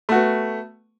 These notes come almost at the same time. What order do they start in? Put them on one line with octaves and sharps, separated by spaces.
A3 F#4 B3